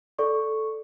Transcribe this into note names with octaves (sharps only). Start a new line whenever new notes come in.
A4 D5 C#6